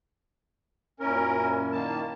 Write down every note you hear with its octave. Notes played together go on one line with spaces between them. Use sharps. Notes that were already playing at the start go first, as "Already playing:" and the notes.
F#2 A#2 C#4 E4 A#4
D#3 A#3 A5